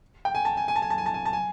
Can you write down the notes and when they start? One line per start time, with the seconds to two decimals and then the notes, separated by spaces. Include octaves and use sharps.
0.25 G5
0.35 G#5
0.45 A5
0.57 G#5
0.68 G#5
0.76 A5
0.82 G#5
0.90 A5
0.98 G#5
1.06 A5
1.14 G#5
1.25 A5
1.33 G#5